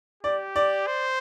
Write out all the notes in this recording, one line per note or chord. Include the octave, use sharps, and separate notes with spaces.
G4 D5
D5
C5